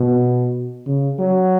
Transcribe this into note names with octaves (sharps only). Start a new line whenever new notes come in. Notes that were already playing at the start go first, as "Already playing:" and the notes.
Already playing: B2
C#3
F#3